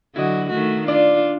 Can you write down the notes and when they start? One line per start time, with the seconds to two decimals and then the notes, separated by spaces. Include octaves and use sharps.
0.16 D3 F#3 E4 F#4 D#5
0.50 D#3 A3 F#4
0.88 D4 F4 D5